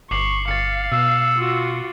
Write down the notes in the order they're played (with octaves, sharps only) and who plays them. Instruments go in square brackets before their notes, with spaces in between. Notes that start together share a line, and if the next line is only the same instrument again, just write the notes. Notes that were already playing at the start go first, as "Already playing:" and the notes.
[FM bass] G1 [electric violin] C#6 [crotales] D6 C7 F#7
[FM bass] G1 [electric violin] F5 [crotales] A6 C#7
[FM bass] B2 [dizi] E6
[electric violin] F4 F#4